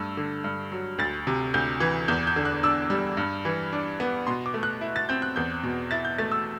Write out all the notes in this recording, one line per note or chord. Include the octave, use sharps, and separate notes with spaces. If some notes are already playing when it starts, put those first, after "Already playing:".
Already playing: G2 A3 E6
D3
G2
F#3
D2 A6
C3
D2 G6
E3
E2 G6
G6
D3
F#6
D4 E6
G3
G2
E3
D4
B3
B2 C6
D6
A3
F#6
E4
A6
C4 G6
F#6
E2 G6
B2
E4 A6
G6
A3 A6
E6